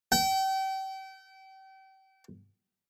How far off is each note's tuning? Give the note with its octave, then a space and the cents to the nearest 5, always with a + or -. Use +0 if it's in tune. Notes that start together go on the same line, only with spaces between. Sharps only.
G5 -35